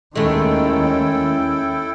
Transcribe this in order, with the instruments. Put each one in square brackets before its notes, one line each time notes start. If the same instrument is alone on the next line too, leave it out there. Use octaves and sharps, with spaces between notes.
[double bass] D#2 D#3 [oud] G#3 A3 [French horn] C#4 [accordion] E4 A4 G5